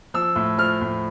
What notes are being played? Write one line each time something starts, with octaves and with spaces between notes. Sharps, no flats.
F3 E6
A2
F3 F6
A2